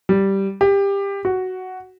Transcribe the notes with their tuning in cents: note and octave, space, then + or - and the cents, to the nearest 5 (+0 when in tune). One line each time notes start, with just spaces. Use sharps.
G3 -5
G4 +20
F#4 +5